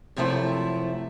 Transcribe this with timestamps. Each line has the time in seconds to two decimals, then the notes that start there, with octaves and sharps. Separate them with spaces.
0.16 F#2 C3 F3 A3 E4